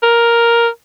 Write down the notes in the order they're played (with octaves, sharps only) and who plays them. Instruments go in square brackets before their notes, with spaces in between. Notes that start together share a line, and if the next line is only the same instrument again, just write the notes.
[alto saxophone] A#4